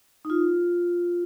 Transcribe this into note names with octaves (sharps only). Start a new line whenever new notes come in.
D#4
F4